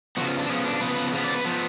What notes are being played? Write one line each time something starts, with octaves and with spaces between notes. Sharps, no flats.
C#3 F3 B3 F#4
F4
D4
C#3 F3 B3 C#4
D4
C#3 F3 B3 B4
C#3 F3 B3
D5
B4
F3 B3